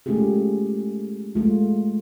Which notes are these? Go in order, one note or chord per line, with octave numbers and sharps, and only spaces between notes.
G#3 A3 C#4 F4 G4 G#4
G#3 A3 F4